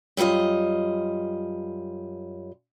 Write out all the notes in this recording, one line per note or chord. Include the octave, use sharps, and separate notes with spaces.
F#2 G3 A#3 F4 D#5